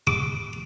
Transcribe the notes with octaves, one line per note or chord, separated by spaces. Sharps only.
D6